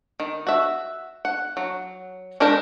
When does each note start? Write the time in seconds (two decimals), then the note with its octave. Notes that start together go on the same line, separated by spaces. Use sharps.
0.20 D#3
0.47 F#4 E5
1.25 F#5
1.57 F#3
2.40 G#3 D4 D#4 G4 A#4